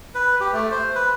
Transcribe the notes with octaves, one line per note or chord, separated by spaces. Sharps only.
B4
G4
A3
C5
B4